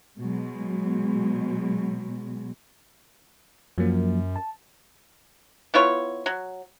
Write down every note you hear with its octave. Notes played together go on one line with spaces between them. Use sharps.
B2 F#3 G#3
F#2 F3 F#3 A#3
A5
B3 E4 F4 C#5
F#3